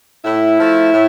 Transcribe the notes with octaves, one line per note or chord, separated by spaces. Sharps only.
A2 E4
F3 A3
A2